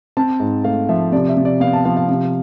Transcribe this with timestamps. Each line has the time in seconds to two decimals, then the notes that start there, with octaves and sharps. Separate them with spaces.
0.17 C4 A5
0.40 G#2
0.64 A3 F5
0.89 F3 E5
1.12 C3 D5
1.29 E5
1.37 C3
1.45 D5
1.60 B3 F5
1.73 A5
1.85 F3 F5
1.97 F5
2.09 C3